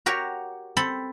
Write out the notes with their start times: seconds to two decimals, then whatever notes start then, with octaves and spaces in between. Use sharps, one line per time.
0.06 F#4 G4 A#4 C#5
0.77 C4 A4 B5